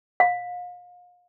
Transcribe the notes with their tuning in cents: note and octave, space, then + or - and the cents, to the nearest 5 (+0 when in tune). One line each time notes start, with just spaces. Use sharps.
F5 +35